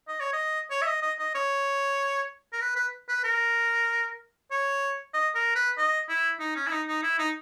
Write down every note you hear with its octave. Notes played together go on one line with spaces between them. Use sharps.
D#5
C#5
D#5
C#5
E5
D#5
D#5
D#5
C#5
A#4
B4
B4
B4
A#4
C#5
D#5
A#4
B4
D#5
E4
D#4
C#4
E4
D#4
D#4
E4
D#4